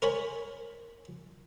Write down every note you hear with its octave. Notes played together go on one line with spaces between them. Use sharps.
A#4 C5 C#5 G#5 B5